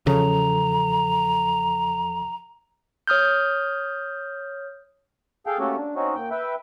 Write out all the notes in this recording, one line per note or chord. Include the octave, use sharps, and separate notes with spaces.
E2 C#3 F3 A4 A#5
C#5 D#6 F6 G6
G#4 A4 F5 G5
A3 A#3 C#4 F#4 G4 A4
D4
C4 C#4 D#4 F#4
A#2 G5
B4 E5 G5